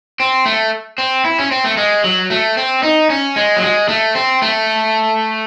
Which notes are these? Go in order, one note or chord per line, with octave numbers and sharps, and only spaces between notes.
C4
A3
C4
E4
C#4
C4
A3
G#3
F#3
A3
C4
D#4
C#4
G#3
F#3
G#3
A3
C4
A3